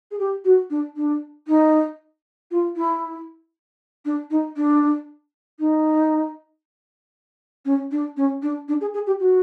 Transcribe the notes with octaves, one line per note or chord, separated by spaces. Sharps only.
G#4
G4
F#4
D4
D4
D#4
F4
E4
D4
D#4
D4
D#4
C#4
D4
C#4
D4
D4
G#4
G#4
G4
F#4